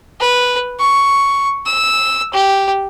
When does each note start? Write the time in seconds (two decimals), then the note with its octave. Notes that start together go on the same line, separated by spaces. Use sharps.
0.20 B4
0.79 C#6
1.66 E6
2.34 G4